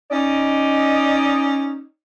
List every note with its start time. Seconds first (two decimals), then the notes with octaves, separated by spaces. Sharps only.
0.11 C#4 D#4 D5 D#5